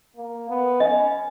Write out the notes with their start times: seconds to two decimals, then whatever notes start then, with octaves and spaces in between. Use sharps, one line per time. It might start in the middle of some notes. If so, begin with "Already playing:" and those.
0.17 A#3
0.49 B3
0.80 C#4 D#5